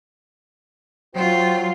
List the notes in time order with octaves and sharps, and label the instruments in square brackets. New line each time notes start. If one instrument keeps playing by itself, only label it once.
[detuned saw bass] F#3 [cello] F4 [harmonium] F#4 C5 G5